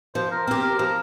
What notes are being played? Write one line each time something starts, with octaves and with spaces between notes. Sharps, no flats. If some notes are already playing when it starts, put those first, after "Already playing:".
F3 C5
A#4
C4 G4 A#4
A#4
F3 A#4